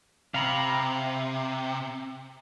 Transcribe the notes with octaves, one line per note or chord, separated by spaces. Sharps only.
C3 F5 A#5 B5